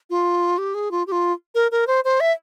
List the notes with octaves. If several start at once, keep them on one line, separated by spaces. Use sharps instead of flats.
F4
G4
G#4
F4
G4
F4
A#4
A#4
C5
C5
E5